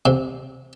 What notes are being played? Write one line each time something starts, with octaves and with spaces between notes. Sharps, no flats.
C3